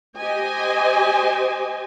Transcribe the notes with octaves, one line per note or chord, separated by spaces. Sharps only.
G4 C5 D#5 G#5